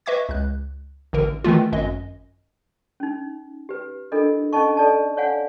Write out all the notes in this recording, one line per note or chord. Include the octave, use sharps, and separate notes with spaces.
B4 D#5 E5 C#6 D6 G#6
C#2 F#6
A1 D3 A#4
D#3 E3 A3 F4
G#1 F#2 D#5
C#4 D#4
G4 B4
D4 E4 F4 A4 A#4 D#5
C#4 D#4 A4 D#5 A5 C#6
A4 D5 D#5 A5
C#5 D5 F5 F#5 G#5